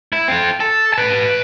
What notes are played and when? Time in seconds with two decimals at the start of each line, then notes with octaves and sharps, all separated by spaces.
0.13 E4
0.28 C4 F4
0.60 A4
0.94 B4 A5